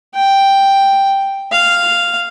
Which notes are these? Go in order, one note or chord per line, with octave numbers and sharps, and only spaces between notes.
G5
F5